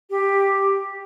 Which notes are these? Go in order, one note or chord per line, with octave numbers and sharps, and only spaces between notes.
G4